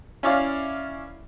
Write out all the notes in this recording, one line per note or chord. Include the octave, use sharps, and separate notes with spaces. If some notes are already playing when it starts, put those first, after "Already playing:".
C#4 E4 D5 F5